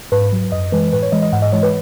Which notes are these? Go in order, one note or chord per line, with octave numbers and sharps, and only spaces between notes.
G#2 B4
F#3
F#2 D#5
E3 G#3 B4
A2 B4
C#5
E3 G#3 D#5
D#5
G#2 F#5
D#5
E3 G#3 C#5
B4